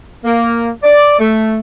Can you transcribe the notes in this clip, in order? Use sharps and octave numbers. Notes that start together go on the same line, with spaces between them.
A#3
D5
A3